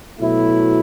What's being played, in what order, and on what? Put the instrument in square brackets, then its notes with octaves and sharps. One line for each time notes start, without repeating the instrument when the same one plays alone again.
[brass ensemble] B2 F#3 A3 E4